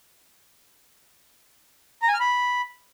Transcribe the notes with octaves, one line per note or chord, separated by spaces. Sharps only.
A#5
G#5
F6
B5